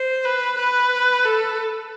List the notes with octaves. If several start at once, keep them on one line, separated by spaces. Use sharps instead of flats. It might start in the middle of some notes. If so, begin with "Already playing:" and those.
Already playing: C5
B4
B4
A4